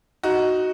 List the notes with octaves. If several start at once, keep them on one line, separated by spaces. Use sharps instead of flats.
D#4 F#4